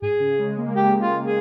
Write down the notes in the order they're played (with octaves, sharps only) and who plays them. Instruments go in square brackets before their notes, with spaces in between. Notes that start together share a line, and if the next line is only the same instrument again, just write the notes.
[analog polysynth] G#2 [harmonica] G#4
[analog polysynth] C#3
G#3
A#3
[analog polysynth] G#3 [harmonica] G4
[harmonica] F4
G#4